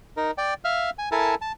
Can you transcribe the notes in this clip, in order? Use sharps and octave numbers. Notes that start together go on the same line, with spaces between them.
D#4 A#4
D5 G5
E5 F5 F6
G#5
E4 A4 A#4 G#5 A5
A5